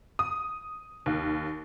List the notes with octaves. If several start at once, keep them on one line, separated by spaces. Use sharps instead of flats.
D#6
D#2